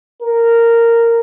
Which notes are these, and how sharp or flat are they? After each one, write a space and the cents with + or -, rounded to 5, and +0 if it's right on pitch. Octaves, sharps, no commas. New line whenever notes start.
A#4 -10